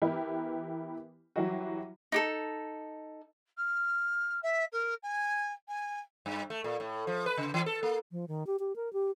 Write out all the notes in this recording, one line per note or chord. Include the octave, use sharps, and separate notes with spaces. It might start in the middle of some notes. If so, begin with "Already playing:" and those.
E3 B3 E4 G4 A#4 B4
E3 F#3 G3 E4 F#4
D#4 G4 A4
F6
E5
A#4
G#5
G#5
G2
A3
A#2
A2
F3
B4
C#3
E3
A4
A#3
F3
D#3
G4
G4
A#4
G4